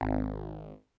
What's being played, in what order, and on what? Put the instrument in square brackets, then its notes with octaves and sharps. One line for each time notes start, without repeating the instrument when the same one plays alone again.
[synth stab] G#1